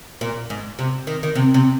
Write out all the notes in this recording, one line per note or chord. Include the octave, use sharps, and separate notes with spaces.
A#2
G#2
C3
D#3
D#3
C3
C3